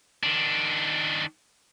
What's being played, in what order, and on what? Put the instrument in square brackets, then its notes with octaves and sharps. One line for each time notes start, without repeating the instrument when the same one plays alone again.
[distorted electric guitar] D#3 D4